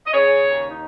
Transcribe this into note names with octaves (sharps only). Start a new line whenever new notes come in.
D#5
C#3 G#4 C#5
D#2
D#4